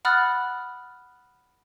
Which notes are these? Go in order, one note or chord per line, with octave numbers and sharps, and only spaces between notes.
F#5 B5 D#6 F6 F#6 A6